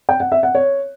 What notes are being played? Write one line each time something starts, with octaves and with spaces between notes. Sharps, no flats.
G5
F#5
E5
F#5
C#5